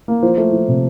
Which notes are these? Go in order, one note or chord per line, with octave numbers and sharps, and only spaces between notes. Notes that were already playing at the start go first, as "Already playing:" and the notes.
A#3
F3 C5
A3
F3
C3